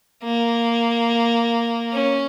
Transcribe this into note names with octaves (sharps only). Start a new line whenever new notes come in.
A#3
C#4